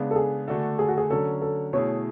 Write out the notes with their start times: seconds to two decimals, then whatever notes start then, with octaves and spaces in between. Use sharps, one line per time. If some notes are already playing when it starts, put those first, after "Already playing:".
Already playing: C#3 G#3 B3 D4
0.11 A4
0.16 G#4
0.48 D3 A3 D4 F#4 A4
0.79 G#4
0.88 F#4
0.97 G#4
1.10 D3 F#3 C#4 A4
1.41 A4
1.73 B2 A3 E4 G#4 C#5